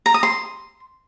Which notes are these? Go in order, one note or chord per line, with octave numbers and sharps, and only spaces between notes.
A#5
D#6
C6